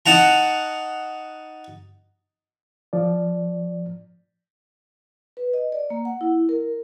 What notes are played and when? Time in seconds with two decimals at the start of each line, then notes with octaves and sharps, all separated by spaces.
0.06 D#4 F#5 A5 A#5
2.93 F3 D5
5.37 B4
5.53 D#5
5.72 D5
5.90 A#3
6.05 F#5
6.21 E4
6.49 A#4